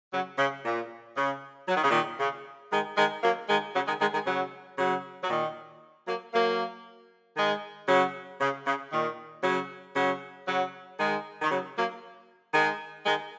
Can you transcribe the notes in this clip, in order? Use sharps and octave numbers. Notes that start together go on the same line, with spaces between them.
C#3 F#3
C#3
A#2
C#3
F#3
D#3
C#3
A#2 D#3
C#3
D#3 G#3
D#3 G#3
F#3 A#3
D#3 G#3
C#3 F#3
D#3 G#3
D#3 G#3
D#3 G#3
C#3 F#3
C#3 F#3
F#3
A#2 D#3
F#3 A#3
F#3 A#3
D#3 G#3
C#3 F#3
C#3
C#3
A#2 D#3
C#3 F#3
C#3 F#3
C#3 F#3
D#3 G#3
D#3
C#3 F#3
F#3 A#3
D#3 G#3
D#3 G#3